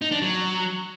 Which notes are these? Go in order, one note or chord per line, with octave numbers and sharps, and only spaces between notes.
D#4
D4
F#3